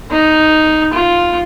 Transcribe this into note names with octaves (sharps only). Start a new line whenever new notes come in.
D#4
F4